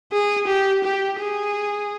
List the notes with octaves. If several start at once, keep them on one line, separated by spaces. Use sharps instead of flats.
G#4
G4
G4
G#4